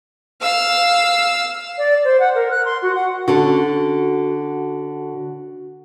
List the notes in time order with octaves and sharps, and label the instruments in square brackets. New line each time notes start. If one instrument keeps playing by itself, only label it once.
[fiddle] F5 E6
[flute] D5
C5
F#5
A#4
F#6
C6
F#4
F#5
[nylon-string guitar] D3 C#4 A4 [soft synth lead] F#4